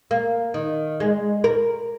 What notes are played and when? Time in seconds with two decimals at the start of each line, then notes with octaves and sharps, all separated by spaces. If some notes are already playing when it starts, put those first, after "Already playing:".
0.11 A#3
0.54 D#3
1.00 G#3
1.44 A#4